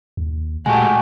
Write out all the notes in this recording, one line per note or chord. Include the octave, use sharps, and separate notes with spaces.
D#2
A#2 G#3 A3 F#4 G4 G#5